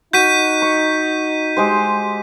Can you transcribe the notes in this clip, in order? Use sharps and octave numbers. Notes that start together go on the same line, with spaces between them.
D#4 F#4 G6 B6 D#7
C#6
G#3 G4 C5